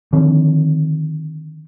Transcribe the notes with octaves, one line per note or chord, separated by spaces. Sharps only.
D3 D#3 F3 C4